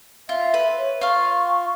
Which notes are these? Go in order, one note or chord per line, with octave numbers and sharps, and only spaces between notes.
F4 E5
B4
C#5
F4 F5 C#6